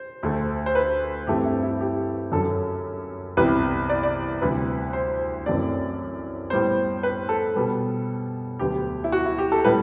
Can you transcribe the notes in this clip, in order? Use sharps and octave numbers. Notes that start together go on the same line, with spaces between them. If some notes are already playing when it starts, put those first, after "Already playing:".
Already playing: C5
D2 D3 A3
C5
B4
G2 E3 A3 C4 G4
E4
E4
G4
F#2 D3 F#3 A4
C2 C3 E3 B3 B4
D5
D5
D2 C3 E3 G3 B4
C5
F#2 E3 A3 C4 D5
A2 G3 B3 C5
B4
A4
B2 G3 B3
D2 D3 F#3 B3 G4
E4
F#4
E4
G4
A4
A2 G3 B3 B4